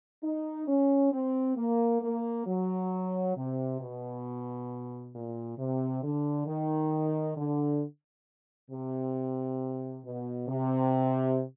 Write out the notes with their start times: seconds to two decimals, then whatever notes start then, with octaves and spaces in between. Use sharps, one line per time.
0.23 D#4
0.68 C#4
1.12 C4
1.57 A#3
2.02 A#3
2.47 F#3
3.36 C3
3.80 B2
5.14 A#2
5.58 C3
6.03 D3
6.47 D#3
7.37 D3
8.70 C3
10.05 B2
10.49 C3